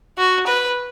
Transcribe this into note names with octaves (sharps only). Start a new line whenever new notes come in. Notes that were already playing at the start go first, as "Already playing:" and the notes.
F#4
B4